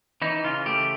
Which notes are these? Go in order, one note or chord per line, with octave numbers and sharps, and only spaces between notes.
E3 D#4
C#3 F4
A3 G4